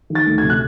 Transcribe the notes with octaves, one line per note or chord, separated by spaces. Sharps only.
D#3
A6
D2
G#6
C3
F#6